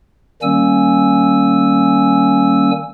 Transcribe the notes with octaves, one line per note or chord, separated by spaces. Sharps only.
D#3 G3 A#3 C#4 G#5 E6